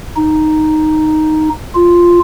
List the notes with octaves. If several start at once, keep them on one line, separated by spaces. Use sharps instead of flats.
D#4
F4